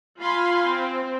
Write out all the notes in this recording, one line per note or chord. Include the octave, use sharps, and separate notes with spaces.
F4 F5 G#5 B5 C6
C4